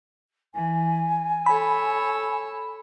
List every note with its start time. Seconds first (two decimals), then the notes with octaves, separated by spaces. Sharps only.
0.54 E3 G#5
1.46 A4 C#5 B5 E6